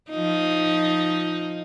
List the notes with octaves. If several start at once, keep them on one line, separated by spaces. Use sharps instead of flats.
F3 D#4